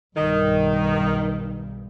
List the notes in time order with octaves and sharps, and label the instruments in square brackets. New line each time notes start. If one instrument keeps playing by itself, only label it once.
[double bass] B1 G2 [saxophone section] D#3